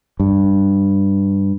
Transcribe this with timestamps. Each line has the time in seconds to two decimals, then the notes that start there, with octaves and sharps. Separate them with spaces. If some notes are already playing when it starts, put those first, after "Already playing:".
0.20 G2